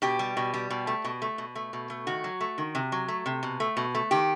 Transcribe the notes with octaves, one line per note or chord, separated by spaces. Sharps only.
B2 G4
G3
B2
G3
B2
A3
B2
A3
B2
A3
B2
A3
D#3 F#4
F#3
A3
D#3
C3
F#3
A3
C3
B2
A3
B2
A3
D#3 G4